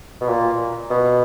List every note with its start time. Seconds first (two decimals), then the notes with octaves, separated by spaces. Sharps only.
0.21 B2
0.28 A#2
0.90 B2